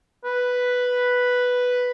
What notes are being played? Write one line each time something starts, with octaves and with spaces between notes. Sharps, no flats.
B4